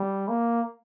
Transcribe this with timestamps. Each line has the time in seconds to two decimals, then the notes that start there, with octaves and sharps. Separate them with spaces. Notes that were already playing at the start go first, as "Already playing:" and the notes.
Already playing: G3
0.28 A#3